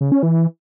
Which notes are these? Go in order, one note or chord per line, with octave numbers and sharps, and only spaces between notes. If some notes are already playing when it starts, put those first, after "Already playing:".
C#3
C#4
E3